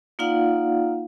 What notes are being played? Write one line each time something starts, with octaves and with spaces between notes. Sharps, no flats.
A#3 D#4 F4 D5 F5 F#5